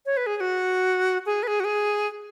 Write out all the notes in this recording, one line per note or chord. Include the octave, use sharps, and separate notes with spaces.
C#5
B4
G#4
G#4
F#4
G#4
B4
G#4
F#4
G#4